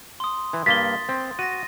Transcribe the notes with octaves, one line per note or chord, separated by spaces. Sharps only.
C6 D#6
E3
G2 A#3 A6 B6 G7
C4
F#4 A#6 D#7